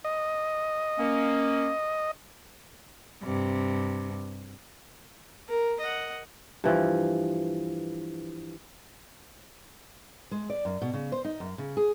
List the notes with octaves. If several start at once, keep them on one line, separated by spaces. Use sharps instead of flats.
D#5
A#3 C#4
G2 C3
A#4
D#5 F#5
G2 E3 F3
G#3
D5
F#2
B2
C#3
C5
D#4
F#2
C#3
G#4